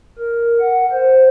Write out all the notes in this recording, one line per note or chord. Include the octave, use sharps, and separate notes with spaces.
A#4
F#5
C5